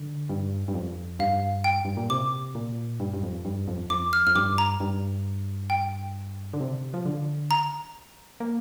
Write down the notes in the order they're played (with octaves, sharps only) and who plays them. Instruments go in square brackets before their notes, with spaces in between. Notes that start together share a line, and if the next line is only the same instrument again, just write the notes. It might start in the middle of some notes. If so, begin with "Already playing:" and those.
Already playing: [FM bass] D3
G2
G2
F2
[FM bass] G2 [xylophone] F5
[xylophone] G5
[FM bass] G2
A#2
[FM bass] C3 [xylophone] D6
[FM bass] A#2
G2
G2
F2
G2
F2
[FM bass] F2 [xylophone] D6
[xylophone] F6
[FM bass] F2 [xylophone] F6
[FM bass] G2 [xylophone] D6
[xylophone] A#5
[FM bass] G2
[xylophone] G5
[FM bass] D3
C3
F3
D3
[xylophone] A#5
[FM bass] A#3